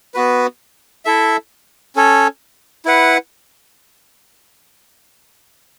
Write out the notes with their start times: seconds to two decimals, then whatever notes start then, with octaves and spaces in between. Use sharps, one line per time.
0.14 B3 F#4 B4
1.05 E4 A4 E5
1.96 C#4 A4 C#5
2.85 E4 B4 F#5